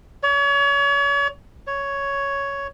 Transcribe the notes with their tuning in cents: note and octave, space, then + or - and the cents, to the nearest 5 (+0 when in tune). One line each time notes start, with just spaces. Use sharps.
C#5 +35
C#5 +5